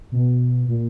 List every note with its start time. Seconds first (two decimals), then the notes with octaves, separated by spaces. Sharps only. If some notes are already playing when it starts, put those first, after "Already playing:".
0.12 B2
0.68 A#2